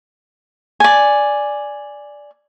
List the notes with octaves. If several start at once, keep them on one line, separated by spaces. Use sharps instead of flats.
D5 G#5